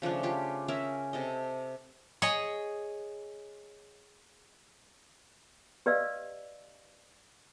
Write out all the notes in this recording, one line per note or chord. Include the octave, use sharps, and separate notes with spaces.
C#3 F3 A3 D4
F4 G4
C#4 G#4 A#4 E5
C3 A4 D#5
G#4 C#5 D#5
G4 B4 D5 D#5 F5 E6